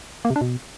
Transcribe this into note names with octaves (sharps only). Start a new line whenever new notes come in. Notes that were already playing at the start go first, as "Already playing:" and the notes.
A#3
C3
D4
B2